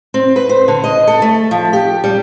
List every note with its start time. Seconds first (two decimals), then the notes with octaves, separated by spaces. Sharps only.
0.14 C4
0.36 B4
0.49 C5
0.68 D3
0.84 D#5
1.07 A4
1.22 A3
1.51 F3
1.73 G4
2.04 G3